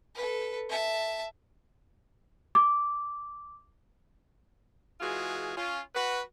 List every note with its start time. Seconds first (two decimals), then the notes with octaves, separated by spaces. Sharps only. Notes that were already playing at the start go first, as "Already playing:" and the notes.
0.15 A4 B4
0.69 E5 A5
2.55 D6
5.00 E3 G#3 F4 F#4 G#4
5.56 C#4 F4
5.95 F#4 B4